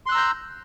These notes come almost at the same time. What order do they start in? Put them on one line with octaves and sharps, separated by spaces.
C6 F#6 E6 A#5 G6